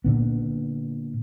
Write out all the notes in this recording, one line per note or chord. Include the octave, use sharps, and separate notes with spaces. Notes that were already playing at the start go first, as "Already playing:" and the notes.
A#2 D3 B3